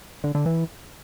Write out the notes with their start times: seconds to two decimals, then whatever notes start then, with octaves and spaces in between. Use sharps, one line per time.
0.24 D3
0.35 D3
0.46 E3